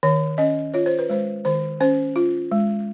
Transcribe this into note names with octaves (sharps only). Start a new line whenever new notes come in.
D#3 C#5
C#4 D#5
F4 C#5
C5
B4
G#3 C5
D#3 C5
C#4 C5
F4
G#3